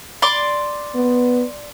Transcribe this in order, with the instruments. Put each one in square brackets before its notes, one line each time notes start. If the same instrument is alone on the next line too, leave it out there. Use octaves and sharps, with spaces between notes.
[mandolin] D5 C6 D6
[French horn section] B3